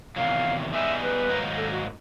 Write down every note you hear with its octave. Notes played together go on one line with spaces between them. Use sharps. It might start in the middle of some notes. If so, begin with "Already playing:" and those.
E2 C3 D#3 F#3 F5
G3 B3 D#4 G#4 E5
B4
G#2 D#3 F#3 A#3 D#4
A4
F#4